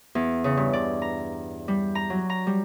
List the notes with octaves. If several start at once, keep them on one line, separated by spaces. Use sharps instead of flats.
E2
C#3
G2
D5
A#5
G3
A#5
F#3
A#5
G3